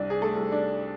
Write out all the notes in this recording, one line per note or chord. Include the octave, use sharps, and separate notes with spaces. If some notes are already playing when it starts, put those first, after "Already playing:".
Already playing: C2 D4 D5
G#4
A3 A4
C2
D4 D5